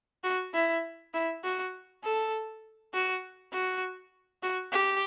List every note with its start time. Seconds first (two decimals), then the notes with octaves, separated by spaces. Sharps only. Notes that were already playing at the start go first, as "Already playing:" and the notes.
0.24 F#4
0.54 E4
1.14 E4
1.44 F#4
2.04 A4
2.93 F#4
3.53 F#4
4.43 F#4
4.72 G4